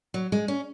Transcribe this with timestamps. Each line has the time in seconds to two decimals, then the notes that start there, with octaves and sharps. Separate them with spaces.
0.14 F#3
0.32 G#3
0.48 C#4